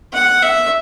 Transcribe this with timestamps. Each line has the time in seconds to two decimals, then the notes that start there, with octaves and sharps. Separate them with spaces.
0.13 F#5
0.42 E5